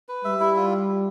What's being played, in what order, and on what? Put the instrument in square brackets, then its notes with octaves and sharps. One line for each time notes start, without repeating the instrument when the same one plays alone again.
[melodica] B4
[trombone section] G3 [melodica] E5
[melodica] E4
F4